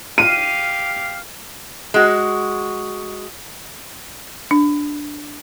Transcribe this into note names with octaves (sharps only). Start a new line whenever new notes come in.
G4 F5 D#7
G#3 F#4
D4